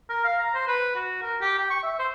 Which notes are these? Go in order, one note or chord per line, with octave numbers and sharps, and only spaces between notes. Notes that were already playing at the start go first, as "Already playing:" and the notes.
A#4
F5
A#5
C5
B4
F#4
A#4
G4
G5
C#6
E5
C5